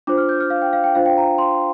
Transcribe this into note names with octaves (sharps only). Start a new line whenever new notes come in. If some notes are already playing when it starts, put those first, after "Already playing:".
D4 F4 C5 D6
F6
G6
F6
F5
G5
F5
G5
D4 F4 C5 F5
G5
A#5
C6